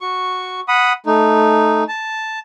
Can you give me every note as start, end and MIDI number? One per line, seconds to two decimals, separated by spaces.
0.01 0.60 66
0.01 0.60 85
0.68 0.93 78
0.68 0.93 83
0.68 0.93 87
1.06 1.84 57
1.06 1.84 63
1.88 2.39 81